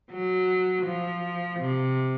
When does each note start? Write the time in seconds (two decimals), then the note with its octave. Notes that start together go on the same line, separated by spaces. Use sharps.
0.12 F#3
0.86 F3
1.60 C3